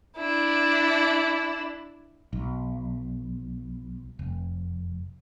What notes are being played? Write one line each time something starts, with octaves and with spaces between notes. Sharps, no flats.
D4 E4
B1
F1